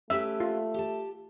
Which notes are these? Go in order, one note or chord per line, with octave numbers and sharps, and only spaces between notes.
A3 C#4 G4 B4 E5
F4
G4 A5